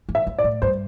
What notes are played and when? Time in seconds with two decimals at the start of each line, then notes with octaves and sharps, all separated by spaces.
0.09 E3
0.15 E5
0.27 F3
0.38 D5
0.44 A2
0.62 G2 C5